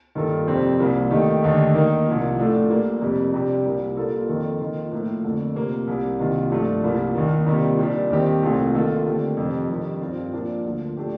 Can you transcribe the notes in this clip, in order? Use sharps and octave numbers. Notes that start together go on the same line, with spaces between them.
G2 D#3 A#3 F4 A4
F2 C3 G3 C4
C2 A#2 G3 A#3
D#3 A3 D#4 G4
D#2 D3 A3 D#4 G4
D#3 A#3 D#4
C2 A#2 F3 A#3
A2 A3 D4 F4 A4
A#2 G3 A#3
F2 C3 G3
C3 G3 D4 G4
C2 A#2 G3 A#3
A#2 G3 A#3 F4 A4
F2 D#3 A#3 F4 A4
D#3 A#3 F4
A2 F3 A#3
F2 D3 A3
C3 F3 A#3
C2 C3 G3
C2 C3 D#3 A#3 F4
G2 F3 A3 D4
C2 A#2 G3 A#3 F4
D#2 D#3 A#3
C3 D#3 G3 A#3 F4
A#2 G3 D4
D#2 D#3 G3 C4 G4
C2 A#2 A3 C4 F4
D#3 A#3 F4 A4
D3 A3 C4 G4
F2 C3 D#3
F2 D#3 G3 D4
G2 F3 C4 F4
A#2 F3 A#3 D4
D2 D3 F3
A2 A3 D4 G4